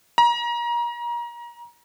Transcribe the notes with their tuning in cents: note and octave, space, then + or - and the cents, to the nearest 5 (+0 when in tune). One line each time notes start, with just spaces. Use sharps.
A#5 +30